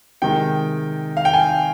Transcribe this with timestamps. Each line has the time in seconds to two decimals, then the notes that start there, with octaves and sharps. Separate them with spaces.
0.22 C3 D#3 G#3 G5
1.17 F5
1.25 G5
1.34 G#5